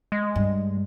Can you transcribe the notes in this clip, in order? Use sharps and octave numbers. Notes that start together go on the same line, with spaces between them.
G#3
G2